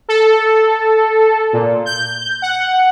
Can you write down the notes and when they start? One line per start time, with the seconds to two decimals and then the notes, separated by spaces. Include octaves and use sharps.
0.08 A4
1.53 A#2
1.86 G6
2.42 F#5